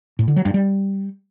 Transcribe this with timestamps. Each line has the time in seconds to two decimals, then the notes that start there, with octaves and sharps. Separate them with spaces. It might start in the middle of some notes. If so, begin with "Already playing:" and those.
0.19 A2
0.28 D3
0.36 F#3
0.45 G2
0.54 G3